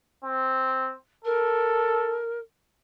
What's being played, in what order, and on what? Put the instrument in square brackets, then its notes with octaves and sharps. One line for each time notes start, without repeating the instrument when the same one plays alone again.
[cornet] C4
[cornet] A4 [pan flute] A#4